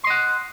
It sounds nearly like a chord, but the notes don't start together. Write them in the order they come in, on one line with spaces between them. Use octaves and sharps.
C6 D#5 F#5